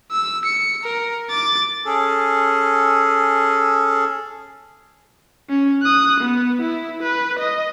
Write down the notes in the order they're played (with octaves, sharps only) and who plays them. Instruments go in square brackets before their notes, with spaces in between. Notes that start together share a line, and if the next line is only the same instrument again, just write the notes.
[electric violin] E6
C#7
A#4
D6 A6
[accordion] C#4 G#4 A4
[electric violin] C#4
D#6 F#6
B3
E4
B4
D#5